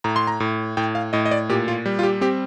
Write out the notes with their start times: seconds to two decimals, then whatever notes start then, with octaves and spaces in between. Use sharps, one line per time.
0.04 A2 A#5
0.16 C6
0.27 A#5
0.40 A2
0.77 A2 G5
0.95 F5
1.13 A2 D#5
1.26 D#5
1.31 D5
1.49 A#2 G4
1.68 F4
1.86 G3
1.99 F4
2.03 G4
2.21 C4 G4